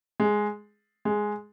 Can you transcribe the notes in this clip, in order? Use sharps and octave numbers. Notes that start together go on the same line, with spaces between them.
G#3
G#3